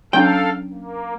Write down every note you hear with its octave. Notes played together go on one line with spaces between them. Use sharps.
F#3 C#4 D4 A4 F5 G5
A#3